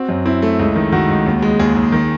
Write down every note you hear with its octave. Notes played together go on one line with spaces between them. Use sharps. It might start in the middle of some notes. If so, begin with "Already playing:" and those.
Already playing: C4 F#4
F#2
C4 E4
A3
C#2
D#3
D#3 F#4
C#2
D#2
G#3
D#2 G#4
D#2
D#3